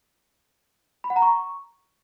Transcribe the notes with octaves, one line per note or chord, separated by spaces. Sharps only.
B5
F#5
A#5
C#6